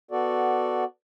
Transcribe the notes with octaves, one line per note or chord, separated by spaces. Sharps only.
B3 F#4 A4 D5